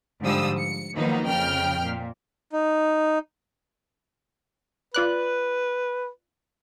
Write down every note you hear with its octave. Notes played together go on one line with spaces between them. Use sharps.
G#2 D3 F3 G3 D#6 E6
C#7
D#3 F3 F#3 A#3 B3 D#4
F2 C#3 G5 F6
A#2
D#4
F4 B4 D5 F#6